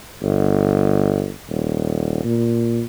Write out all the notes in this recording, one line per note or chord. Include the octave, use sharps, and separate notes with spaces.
G1
D#1
A#2